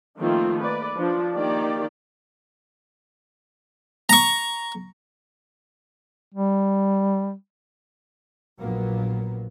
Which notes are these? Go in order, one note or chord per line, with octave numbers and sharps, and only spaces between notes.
D#3 F3 A3 A#3 C4 F4
B4 D5
F3 D4
D#3 A#3 G4 D5
A#5 C#6
G3
A#1 A#2 F#3 A#3 B3